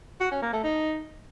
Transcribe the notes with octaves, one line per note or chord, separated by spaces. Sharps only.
F#4
C#4
A#3
A3
D#4